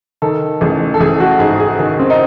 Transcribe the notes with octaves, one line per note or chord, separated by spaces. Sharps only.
D#3 A4
A1 G#4
A4
A1 G#4
F#4
G#2 G#4
G#4
D#3 G#4
C4
D#4